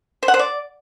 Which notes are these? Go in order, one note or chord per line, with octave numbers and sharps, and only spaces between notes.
C5
F#5
C5
D5